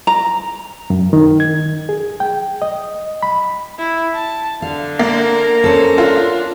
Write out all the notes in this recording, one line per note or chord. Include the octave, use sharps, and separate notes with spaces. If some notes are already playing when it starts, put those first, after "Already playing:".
A#5
F#2
D#3
G#6
G#4
G5
D#5
B5
E4
A5
D3 F5
A#3 A#4 A#5
C#4 A4 C5
D4 F4